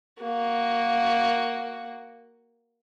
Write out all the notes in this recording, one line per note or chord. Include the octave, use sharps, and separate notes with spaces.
A#3 F#4